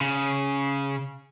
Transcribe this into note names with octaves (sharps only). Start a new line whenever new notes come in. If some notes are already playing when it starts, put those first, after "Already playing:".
C#3